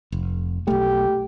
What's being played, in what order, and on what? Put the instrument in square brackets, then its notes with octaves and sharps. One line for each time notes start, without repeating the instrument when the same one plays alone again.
[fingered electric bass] F1
[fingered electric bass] B1 A3 [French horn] G4